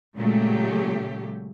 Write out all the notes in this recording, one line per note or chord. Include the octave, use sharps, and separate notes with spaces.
A#2 C#3 F#3 G#3 A3 G4